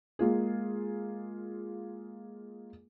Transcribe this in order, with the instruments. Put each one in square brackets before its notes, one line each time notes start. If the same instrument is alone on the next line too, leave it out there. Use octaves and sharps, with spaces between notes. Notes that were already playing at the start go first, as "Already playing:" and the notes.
[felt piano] G#3 A#3 F4 G#4